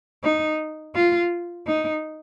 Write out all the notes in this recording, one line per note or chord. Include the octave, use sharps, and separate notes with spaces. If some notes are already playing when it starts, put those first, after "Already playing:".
D#4
F4
D#4